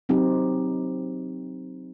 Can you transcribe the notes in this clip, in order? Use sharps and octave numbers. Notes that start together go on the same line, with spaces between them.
F#3 C4 D#4 G4